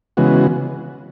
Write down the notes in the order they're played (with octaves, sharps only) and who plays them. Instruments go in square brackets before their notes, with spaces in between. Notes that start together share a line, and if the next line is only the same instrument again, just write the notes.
[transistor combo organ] C#3 E3 G#3 B3 F#4